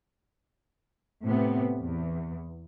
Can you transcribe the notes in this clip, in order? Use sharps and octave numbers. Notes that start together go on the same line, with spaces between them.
A2 C3 B3
E2